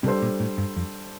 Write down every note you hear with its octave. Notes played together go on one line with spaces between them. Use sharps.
C3 G3 D4 A4 C5
A#2
A2
G2
F2